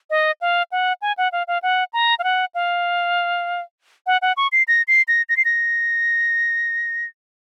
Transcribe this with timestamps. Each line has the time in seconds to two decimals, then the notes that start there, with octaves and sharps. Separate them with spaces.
0.10 D#5
0.41 F5
0.72 F#5
1.02 G#5
1.18 F#5
1.32 F5
1.48 F5
1.63 F#5
1.93 A#5
2.19 F5
2.24 F#5
2.55 F5
4.07 F#5
4.22 F#5
4.37 C#6
4.52 C7
4.68 A#6
4.88 C7
5.08 A#6
5.29 A#6
5.37 C7
5.45 A#6